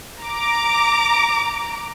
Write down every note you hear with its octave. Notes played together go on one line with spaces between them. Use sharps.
A#5 D6